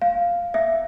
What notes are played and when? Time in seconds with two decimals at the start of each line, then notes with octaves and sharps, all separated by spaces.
0.02 F5
0.54 E5